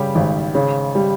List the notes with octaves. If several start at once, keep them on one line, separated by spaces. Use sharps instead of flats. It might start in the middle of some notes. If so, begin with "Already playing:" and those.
Already playing: C#3 G3 G4
G#1
C#3
G3